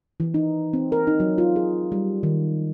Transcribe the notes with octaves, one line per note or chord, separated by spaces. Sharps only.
E3
D#4
C4
A#4
D#4
F#3
F4
G#4
G3
D#3